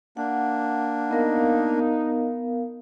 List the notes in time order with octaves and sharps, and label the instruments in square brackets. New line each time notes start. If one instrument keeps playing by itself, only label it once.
[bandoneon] A#3 D4 [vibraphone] F#5
[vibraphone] B3 A#4 F5 [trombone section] D#4